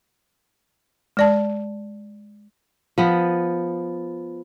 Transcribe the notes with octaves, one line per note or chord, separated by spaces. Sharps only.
G#3 D5 A5
F3 B3